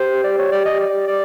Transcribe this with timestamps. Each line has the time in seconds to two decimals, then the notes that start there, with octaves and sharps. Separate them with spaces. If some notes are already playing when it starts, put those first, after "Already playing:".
Already playing: G4 C5
0.24 D5
0.39 C#5
0.52 D5
0.65 D#5
0.80 D5
1.07 D5